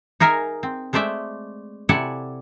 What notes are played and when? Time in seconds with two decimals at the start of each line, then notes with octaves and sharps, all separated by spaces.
0.20 D#4 G#4 A#4 E5 G#5
0.63 C4
0.93 G#3 A3 C5 D5 E5
1.89 C3 E4 A4 D5 F#5 G#5